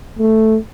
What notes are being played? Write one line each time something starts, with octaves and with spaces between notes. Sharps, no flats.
A3